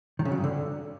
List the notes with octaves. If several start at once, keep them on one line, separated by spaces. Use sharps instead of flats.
D#3
C#3
F#3
G2
D3